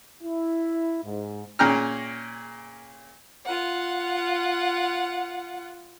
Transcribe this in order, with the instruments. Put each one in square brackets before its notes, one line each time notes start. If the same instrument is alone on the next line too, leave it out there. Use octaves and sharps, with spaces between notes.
[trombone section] E4
G#2
[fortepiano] A#2 C#4 G#4 G5 A#5 F6
[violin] F4 F#5